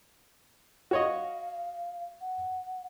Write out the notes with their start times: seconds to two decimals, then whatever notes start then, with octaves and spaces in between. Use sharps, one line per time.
0.91 F#4 C#5 D#5 F5
2.21 F#5